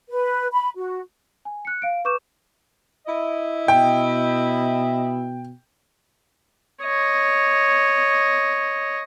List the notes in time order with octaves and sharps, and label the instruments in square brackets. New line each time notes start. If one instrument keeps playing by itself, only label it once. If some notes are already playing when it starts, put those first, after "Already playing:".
[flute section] B4
B5
F#4
[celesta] G#5
F#6 C#7
F5 D7
B4 C#6 D6 G6 E7
[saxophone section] E4 D#5
[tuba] B2 [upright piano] G5
[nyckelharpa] C#5 D#5